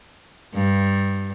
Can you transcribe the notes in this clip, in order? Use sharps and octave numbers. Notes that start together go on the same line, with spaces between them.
G2